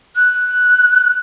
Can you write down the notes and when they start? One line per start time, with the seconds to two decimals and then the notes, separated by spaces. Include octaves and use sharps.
0.16 F#6